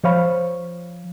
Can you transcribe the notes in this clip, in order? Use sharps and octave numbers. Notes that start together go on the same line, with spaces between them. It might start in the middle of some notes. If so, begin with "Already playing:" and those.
F3 C5 C#5 F5 B5